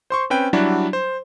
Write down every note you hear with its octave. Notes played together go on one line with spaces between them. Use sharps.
C5 C6 C#6
C4 C#4 B4 G5
F#3 G3 D4 E4 F#4
C5